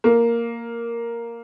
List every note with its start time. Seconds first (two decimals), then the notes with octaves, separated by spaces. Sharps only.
0.04 A#3